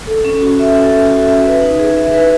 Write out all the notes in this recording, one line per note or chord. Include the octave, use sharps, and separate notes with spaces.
A4
C#4
F#4
E5
A4
C#4
F#4
E5
B4
D#4
G#4
E5
B4